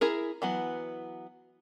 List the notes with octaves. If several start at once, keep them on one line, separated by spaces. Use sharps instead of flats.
E4 G#4 A#4
E3 F#3 B3